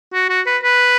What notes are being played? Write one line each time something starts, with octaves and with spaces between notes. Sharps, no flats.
F#4
F#4
B4
B4